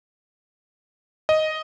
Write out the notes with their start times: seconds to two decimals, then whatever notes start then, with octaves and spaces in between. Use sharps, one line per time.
1.29 D#5